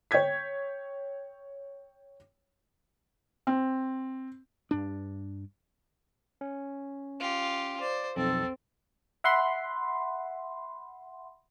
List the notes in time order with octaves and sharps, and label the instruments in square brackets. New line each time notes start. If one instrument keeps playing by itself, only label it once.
[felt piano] C#5 G5 G6 G#6 B6
C4
[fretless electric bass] G2 D4
[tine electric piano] C#4
[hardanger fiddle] F4 G4
[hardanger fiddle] C5 [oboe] D5
[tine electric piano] B1 F2 [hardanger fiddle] C4 [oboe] A4
[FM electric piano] E5 F#5 B5 C6